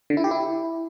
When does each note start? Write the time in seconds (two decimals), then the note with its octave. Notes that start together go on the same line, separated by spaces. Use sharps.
0.10 D3
0.17 E4
0.24 G4
0.31 E4